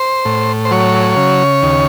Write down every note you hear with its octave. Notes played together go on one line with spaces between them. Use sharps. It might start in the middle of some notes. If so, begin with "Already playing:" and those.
Already playing: C5
A2
C5
F#3 C#5
C#3
D#2